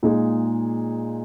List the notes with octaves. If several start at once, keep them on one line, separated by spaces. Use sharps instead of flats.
A#2 G#3 D#4 G#4